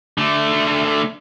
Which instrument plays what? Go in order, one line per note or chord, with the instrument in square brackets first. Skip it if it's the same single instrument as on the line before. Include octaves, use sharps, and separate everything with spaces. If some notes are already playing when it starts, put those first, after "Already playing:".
[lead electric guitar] D3 A3